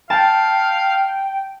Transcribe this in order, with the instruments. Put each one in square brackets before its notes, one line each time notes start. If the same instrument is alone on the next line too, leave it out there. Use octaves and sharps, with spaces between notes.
[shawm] F5 [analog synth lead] G5 [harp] A5